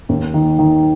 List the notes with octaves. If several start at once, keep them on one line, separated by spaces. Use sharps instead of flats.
D#2
D#3
D#3